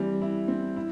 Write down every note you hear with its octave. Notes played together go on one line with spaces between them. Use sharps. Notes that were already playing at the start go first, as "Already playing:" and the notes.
Already playing: E3 G3 C4
E4
C4
E4